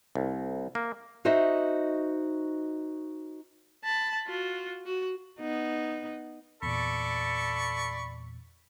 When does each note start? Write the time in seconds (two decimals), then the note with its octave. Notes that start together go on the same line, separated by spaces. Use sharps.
0.15 C2
0.75 A#3
1.25 D#4 F#4 C5 D#5 E5
3.84 A5 B5
4.26 F4 F#4
4.86 F#4
5.39 B3 D#4
6.63 E2 A#2 A4 D5 B5 C#6